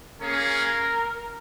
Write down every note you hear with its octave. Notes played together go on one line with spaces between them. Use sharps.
A#3 C#4 G#4 A#4 C#5 F5